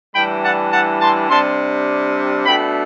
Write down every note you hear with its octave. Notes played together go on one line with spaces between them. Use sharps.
A2 E3 G3 D4 G5 B5
F#5 A5
F#5 A5
A5 C6
C3 G3 D4 A5 C6
B2 A3 D4 G5 B5